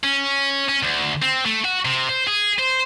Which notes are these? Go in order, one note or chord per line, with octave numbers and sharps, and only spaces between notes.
C#4
C#4
D2
C4
A3
F#4
C3
C5
G#4
C5